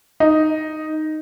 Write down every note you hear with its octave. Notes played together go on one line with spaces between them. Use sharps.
D#4